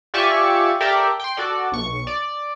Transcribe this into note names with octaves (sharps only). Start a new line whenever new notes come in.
F4 G4 D5 E5 G#5 C#6
G4 A4 A#4 D5 E5 G5
G5 C6
F#4 A4 D5
B1 C#6
D5